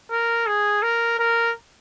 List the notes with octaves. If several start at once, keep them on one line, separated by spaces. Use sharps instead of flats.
A#4
G#4
A#4
A#4